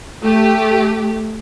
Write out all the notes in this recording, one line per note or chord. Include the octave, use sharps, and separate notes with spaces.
A3 G4